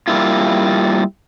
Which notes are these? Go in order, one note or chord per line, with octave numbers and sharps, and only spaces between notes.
G3 A#3 E4 F4